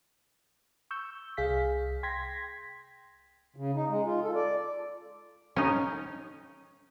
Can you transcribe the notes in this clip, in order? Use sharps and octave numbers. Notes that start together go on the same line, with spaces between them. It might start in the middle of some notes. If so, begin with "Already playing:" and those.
C#6 E6 G6
C2 G#4 F5 B6
G5 C6 G#6 A#6 B6
C#3
D#4
G#3
F4
A4
D5
C#4 D#4